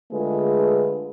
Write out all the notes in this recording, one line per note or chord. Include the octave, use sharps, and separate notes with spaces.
D3 G#3 A3 F4 G#4 B4